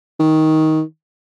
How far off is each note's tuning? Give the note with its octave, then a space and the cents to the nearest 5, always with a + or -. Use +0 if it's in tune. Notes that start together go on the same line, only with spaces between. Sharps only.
D#3 +15